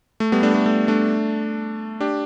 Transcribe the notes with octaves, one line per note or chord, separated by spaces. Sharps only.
A3
G3 B3
A3 D4
A3
A3
A3 D4
D4 G4